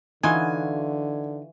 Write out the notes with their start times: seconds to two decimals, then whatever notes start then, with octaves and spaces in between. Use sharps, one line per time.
0.23 D3 E3 D#4 F4 F#4 G#5